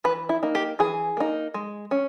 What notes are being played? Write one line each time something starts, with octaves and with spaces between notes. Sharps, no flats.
E3 B4
E4
A#3 D#4
G4
E3 G#4
A#3 D#4
G#3
C#4